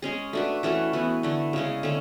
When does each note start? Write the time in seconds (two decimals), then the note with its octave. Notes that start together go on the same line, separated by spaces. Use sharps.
0.02 G#3 C#4 G#4
0.33 A3 D4 F#4 B4
0.63 E3 A3 C#4 F#4
0.93 E3 B3 F#4
1.23 D3 A3 E4
1.53 C#3 G#3 C#4
1.83 D3 A3 C#4